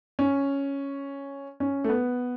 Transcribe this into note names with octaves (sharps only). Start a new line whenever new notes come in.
C#4
C#4
A3
B3